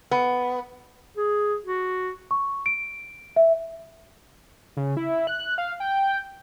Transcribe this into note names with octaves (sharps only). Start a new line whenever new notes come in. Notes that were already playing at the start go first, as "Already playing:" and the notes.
B3
G#4
F#4
C#6
D7
E5
C#3
E4
F#6
F5
G5